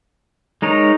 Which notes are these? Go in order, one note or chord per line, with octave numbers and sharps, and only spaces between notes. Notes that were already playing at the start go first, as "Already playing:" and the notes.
G#3 D#4 A#4 C#5